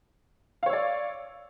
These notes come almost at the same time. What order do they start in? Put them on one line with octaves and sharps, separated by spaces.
F5 C#5 E6 D5